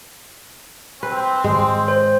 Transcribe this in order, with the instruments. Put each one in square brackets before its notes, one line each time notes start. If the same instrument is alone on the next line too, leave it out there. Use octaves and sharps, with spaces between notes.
[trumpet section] C4 [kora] B4
[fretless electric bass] G#2 D#3 [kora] G#3
[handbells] C5